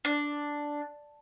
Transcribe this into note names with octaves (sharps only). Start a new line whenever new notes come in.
D4